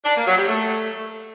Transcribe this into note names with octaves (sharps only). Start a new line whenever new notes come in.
D4
A#3
F#3
G3
A3